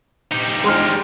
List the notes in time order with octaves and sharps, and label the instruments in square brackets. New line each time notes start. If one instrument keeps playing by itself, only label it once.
[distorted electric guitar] G3 D#4
[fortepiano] G#3 C6 F6